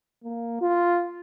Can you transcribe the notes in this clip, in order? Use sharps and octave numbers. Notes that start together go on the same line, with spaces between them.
A#3
F4